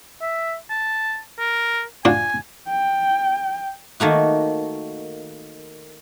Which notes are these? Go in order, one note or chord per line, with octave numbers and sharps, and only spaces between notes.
E5
A5
A#4
D4 F4 F#4 G#5
G5
D#3 A3 A#3 F#4